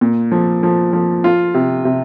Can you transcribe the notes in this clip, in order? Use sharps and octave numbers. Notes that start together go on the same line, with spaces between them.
A#2
F3
F3
F3
F4
C3
C3